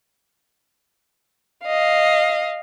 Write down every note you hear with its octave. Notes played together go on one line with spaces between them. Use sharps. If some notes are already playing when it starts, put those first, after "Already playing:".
D#5 F5